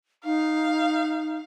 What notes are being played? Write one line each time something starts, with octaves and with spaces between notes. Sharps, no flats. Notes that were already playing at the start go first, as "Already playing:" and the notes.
D#4 F5